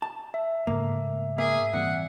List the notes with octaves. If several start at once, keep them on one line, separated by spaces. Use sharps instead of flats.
A5
E5
G#2 C#3 A3 A#3
A#3 G#4 E5
A#2 E3 G3 C4 F#5